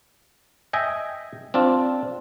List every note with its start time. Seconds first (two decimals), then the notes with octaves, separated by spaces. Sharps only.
0.73 D#5 E5 G5 G#5
1.54 C4 D4 F4